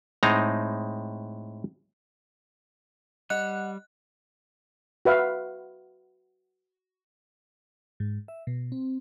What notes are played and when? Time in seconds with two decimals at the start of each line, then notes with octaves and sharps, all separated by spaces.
0.23 A2 G#3 C4 D#4 A#5
3.30 G3 D#5 F#5 F#6
5.05 F#4 B4 E5 F5
8.00 G#2
8.28 E5
8.47 B2
8.72 C4